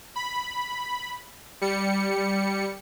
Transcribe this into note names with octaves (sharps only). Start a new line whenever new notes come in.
B5
G3 C#7